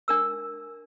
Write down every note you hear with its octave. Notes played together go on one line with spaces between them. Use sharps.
D4 A#4 E6